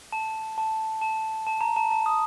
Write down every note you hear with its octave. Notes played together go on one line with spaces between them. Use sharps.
A5
A5
A5
A5
A#5
A5
A5
D#6